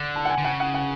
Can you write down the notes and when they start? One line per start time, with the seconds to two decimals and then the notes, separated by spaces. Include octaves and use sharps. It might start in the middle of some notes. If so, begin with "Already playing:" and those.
Already playing: D3
0.16 A5
0.25 F#5
0.30 G#5
0.38 D3
0.45 C#3 F#5
0.60 F#5
0.74 F#5